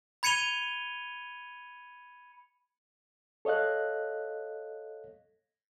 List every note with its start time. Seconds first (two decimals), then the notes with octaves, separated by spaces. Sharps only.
0.23 B5 G#6 C#7 D#7 F7 G7
3.45 A4 C#5 D#5 F5 F#6